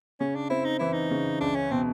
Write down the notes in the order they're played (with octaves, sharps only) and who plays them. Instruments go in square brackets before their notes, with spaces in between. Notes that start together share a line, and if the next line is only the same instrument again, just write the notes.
[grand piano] C#3 [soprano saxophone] C#4
[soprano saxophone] D4
[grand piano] C4 [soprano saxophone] E4
[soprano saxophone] D#4
[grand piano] E3 [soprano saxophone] E4
[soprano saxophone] D#4
[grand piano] C#3
[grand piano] C#2 [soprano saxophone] D4
[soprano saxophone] C#4
[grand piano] B2 [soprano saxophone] C4